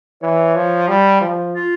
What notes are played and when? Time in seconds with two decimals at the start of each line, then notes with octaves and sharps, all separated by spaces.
0.22 E3 C#5
0.56 F3
0.88 G3
1.21 F3
1.54 F4